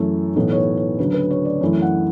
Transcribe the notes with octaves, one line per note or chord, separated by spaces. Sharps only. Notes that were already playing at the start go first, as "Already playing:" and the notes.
Already playing: F#2 E3 A3 A4
B1 A2 E3 B3 A4
C#5
B4
C#5
D2 C#3 F#3 B4
B4
C#5
D5
F#2 E3 A3
F#5